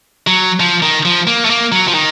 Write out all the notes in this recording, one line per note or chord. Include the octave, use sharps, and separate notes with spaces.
F#3
F3
D#3
F3
A#3
A3
A#3
F#3
F3
D#3